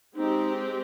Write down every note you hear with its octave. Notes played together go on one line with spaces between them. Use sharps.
G#3 C4 D#4 G4